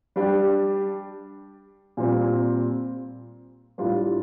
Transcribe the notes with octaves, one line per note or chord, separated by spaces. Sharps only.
G3 D4 G4
A#2 G3 C4
A2 G3 D4 F4